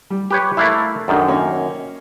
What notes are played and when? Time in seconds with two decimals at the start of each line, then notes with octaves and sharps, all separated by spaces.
0.10 G3
0.31 G4 B4 C#5
0.57 A3 A#3 E4 E5 F5 F#6
1.08 F#2 D#3 D4 A4 D5
1.28 A#3 C#4